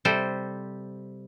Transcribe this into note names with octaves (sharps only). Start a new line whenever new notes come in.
C3 G3 A4 C5